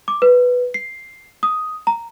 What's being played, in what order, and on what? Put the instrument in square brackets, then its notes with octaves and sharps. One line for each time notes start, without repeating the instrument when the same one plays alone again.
[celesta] D6
B4
C7
D#6
A#5